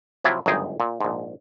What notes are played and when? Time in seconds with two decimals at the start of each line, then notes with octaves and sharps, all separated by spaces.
0.24 C3 F3 F#3 E4 F4
0.46 G1 C#2 F#2 D#4 G#4 G5
0.80 A#2
1.00 A#1 G#2